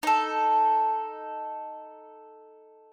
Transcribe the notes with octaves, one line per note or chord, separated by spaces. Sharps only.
D#4 A4